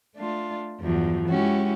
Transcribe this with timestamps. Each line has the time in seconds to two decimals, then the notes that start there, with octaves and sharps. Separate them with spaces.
0.15 A3 D4 F4
0.81 E2 G2 F3 F#3
1.30 G#3 C#4 E4 F#4 G4